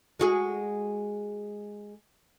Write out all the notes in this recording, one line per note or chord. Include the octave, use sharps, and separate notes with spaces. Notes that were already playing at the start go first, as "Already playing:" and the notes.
G#3 F#4 G#4